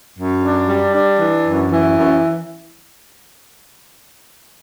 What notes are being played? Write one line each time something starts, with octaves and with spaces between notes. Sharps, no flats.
F#2
D4
G3
D4
E3
F#2
E3
F#2